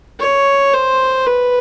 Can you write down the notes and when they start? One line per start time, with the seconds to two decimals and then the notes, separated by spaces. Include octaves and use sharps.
0.20 C#5
0.73 C5
1.26 B4